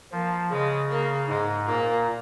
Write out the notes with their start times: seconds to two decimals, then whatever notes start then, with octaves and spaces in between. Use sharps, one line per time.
0.12 F3 A#3
0.50 C#3 G#3
0.89 A#3
1.28 G#2 G#3
1.66 A#2 A#3